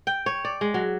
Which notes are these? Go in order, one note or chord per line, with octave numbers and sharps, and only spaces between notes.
G5
C#5
D5
G#3
F#3